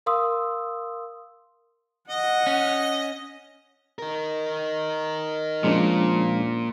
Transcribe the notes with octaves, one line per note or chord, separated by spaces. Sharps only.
A#4 F5 C6 D#6 E6
D#5 F#5
C#4
D#4 A#4
A#2 F3 G#3 C#4 D4